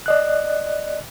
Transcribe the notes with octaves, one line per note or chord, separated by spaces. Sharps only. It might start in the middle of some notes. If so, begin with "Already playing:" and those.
D5 D#5 F#6